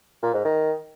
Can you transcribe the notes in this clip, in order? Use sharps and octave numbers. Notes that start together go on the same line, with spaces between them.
A#2
G#2
D#3